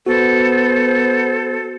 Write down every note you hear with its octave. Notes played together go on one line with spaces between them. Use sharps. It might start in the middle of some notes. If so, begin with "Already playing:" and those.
B3 F#4 A4 C5